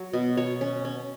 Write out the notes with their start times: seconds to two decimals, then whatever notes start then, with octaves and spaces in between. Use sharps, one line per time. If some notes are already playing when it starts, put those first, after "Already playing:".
Already playing: F#3 C#5
0.13 B2
0.37 B2 C#5
0.61 C#4
0.85 C#4